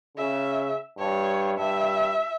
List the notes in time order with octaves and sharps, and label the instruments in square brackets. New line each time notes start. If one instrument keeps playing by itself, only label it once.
[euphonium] C#3 [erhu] E5
[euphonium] G2 [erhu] C#5
[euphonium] G2 [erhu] E5